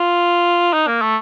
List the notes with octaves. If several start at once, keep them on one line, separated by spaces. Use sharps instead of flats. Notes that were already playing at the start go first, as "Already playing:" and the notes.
Already playing: F4
D#4
A#3
A3